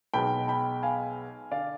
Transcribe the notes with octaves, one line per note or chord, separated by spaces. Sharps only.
B1 B2 G#3 B3 G5 B5
G5 B5
F5 G#5
D3 D5 F5